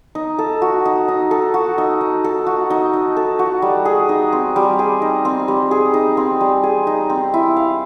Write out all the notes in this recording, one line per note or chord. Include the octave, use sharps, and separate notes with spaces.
D#4
A4
F#4
D#4
D#4
A4
F#4
D#4
D#4
A4
F#4
D#4
D#4
A4
F#4
G3
G#4
D#4
C4
G3
G#4
D#4
C4
G3
G#4
D#4
C4
G3
G#4
D#4
C4
E4
F5